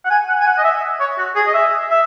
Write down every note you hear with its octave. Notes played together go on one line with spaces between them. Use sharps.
F#5
G#5
F#5
G#5
F#5
D#5
E5
C#5
F#4
G#4
D#5
E5
E5